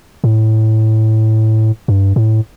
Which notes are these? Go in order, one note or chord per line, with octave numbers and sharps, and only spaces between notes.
A2
G2
A2